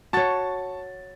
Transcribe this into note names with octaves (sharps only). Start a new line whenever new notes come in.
F#4 C#5 A5 C#6 A6